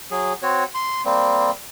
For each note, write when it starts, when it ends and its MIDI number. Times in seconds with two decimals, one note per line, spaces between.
0.11 0.33 54
0.11 0.33 68
0.42 0.64 60
0.42 0.64 66
0.42 0.64 73
0.75 1.02 84
1.05 1.51 55
1.05 1.51 58
1.05 1.51 60